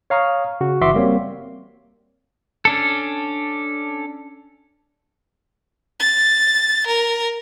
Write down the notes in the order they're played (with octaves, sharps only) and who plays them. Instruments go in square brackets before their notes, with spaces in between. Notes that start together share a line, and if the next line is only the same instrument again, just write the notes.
[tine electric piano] C#5 F5 A#5 C#6 D#6 F6
C#3 F#4
G1 E3 F#4 E5 C6 D6
G3 A#3 C4 C#5
[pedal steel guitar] C#4 D4 A4
[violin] A6
A#4